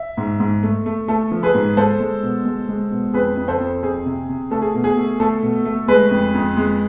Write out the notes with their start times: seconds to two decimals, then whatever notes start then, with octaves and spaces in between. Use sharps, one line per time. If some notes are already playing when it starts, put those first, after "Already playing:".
Already playing: E5
0.17 G#2
0.40 G#2
0.63 A3
0.86 A3
1.08 A3 A4
1.31 F3
1.43 G#4 B4
1.55 G#2
1.77 G#3 A4 C5
2.00 G#3
2.23 B2
2.45 G#3
2.69 G#3
2.91 B2
3.14 F2 G#4 B4
3.37 F2
3.48 A4 C5
3.60 F2
3.83 F2 G#4
4.05 C3
4.29 C3
4.51 A3 A4
4.62 G#4
4.74 B2
4.84 G#4
4.97 A3
5.20 A3 A4
5.43 B2
5.65 A3
5.88 G#3 G#4 B4
6.11 F2
6.34 F2
6.57 G#3